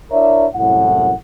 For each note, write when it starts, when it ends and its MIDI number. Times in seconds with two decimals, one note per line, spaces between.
0.11 0.46 62
0.11 0.46 64
0.11 0.46 70
0.11 0.46 73
0.11 0.46 74
0.11 0.46 76
0.53 1.13 36
0.53 1.13 42
0.53 1.13 45
0.53 1.13 64
0.53 1.13 78